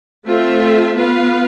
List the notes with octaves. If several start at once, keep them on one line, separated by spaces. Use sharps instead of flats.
A3 C4 F4 A4 E5
B3 F4 B4 F5